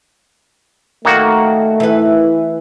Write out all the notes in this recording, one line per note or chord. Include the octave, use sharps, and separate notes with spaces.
D#3 A3 A#3 F#4
E3 B4